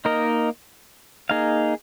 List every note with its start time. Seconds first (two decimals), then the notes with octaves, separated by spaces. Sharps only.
0.05 A#3 D#4 A#4 D#5
1.29 A#3 D#4 G#4 F5